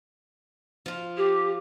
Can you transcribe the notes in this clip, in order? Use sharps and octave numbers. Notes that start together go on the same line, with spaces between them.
F3 F4
G4